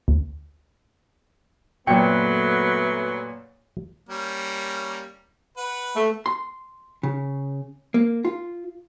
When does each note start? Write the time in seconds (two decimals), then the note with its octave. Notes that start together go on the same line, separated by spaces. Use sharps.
0.08 D2
1.87 F#2 A#2 F#3 A3 B3 B4 G5 C#7
4.09 G3 A#3 C#4
5.57 B4 F#5
5.96 A3
6.26 C6
7.03 C#3
7.94 A#3
8.25 F4